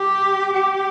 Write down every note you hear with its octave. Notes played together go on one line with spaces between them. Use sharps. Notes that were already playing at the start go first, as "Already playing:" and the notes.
Already playing: G4
G4